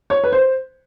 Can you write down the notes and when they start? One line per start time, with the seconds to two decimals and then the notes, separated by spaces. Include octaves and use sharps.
0.10 C#5
0.24 B4
0.32 C5